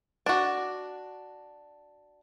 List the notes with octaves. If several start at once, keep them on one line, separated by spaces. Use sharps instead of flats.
D4 F#4